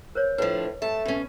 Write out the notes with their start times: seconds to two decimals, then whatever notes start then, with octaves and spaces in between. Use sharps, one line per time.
0.15 A#4 C5 C#5
0.38 A2 F3 D4 B4 D#5
0.82 A3 A5
1.05 B2 C#4